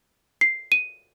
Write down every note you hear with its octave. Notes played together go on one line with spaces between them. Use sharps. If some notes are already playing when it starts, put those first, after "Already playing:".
C7
D#7